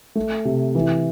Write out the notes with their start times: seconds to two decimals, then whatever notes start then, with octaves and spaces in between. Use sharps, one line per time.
0.15 A3
0.45 C3
0.75 E3